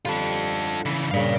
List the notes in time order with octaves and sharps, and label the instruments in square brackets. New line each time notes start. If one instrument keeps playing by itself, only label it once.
[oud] D3 G3 [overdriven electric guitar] F4 A4
[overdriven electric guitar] C#3 E3
[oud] G2 A#2 C#3 [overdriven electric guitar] D5 F5